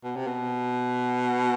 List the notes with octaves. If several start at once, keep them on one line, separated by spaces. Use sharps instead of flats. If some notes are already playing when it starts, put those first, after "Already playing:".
B2
C3
B2